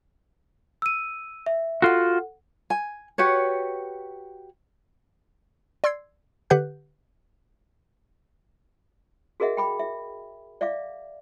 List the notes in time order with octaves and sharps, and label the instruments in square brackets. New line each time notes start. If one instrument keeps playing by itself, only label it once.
[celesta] E6 D#7
E5
[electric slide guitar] F4 F#4 [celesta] A4 F#5
[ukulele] G#5
F#4 G4 B4 C#5
[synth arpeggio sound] D5 C6 E6 G#6 C7
D3 G4 B4 F#5 F#6 G6
[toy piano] F#4 G#4 A#4 D#5 E5 F#5
G5 B5 D6
E5
D5 E5 F5 D6